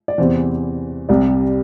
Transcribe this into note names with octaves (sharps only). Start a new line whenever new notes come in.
D5
E2 C3 E3 C5
C2 C3 G3 D5